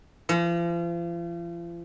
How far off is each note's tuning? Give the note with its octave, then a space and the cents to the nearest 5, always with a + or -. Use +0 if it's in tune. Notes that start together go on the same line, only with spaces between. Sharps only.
F3 -40